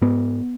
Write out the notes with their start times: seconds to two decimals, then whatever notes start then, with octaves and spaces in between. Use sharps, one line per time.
0.01 G#2 B3